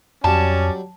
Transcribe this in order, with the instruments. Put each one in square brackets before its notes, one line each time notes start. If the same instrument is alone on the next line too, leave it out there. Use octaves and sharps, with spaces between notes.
[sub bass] F2 [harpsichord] F#3 G3 [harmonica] C#4 D5 [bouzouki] A5